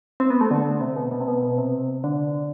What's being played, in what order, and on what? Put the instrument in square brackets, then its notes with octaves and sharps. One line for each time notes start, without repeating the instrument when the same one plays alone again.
[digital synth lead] C4
B3
A3
D3
C3
B2
B2
C3
B2
B2
C3
D3